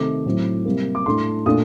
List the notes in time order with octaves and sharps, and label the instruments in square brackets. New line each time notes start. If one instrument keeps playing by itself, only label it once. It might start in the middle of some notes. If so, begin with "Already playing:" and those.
Already playing: [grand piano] C3 D#3 A3 D6
A2 F#3 C4
C3 G3 A#3
D6
A2 A3 D4 C6
A#2 A3 D4 D#6